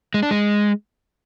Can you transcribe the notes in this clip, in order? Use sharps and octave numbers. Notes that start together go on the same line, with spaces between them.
G#3
D4
G#3